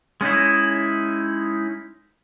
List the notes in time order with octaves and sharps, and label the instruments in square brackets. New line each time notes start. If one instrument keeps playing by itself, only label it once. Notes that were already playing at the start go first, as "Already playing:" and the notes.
[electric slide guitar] G#3 C#4 D#4 E4